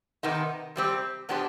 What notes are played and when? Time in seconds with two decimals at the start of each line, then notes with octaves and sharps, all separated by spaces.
0.23 C3 D#3 B3 D#4
0.76 C3 G3 C4 G4
1.29 B2 B3 D4 G4 C5